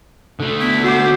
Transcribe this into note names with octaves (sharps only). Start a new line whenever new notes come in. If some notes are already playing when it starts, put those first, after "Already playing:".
D3 A3
B3 E4
F#4 C5 F#5 D6